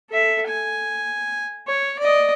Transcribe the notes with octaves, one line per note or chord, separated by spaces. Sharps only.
A4 E5
G#5
C#5
D5 D#5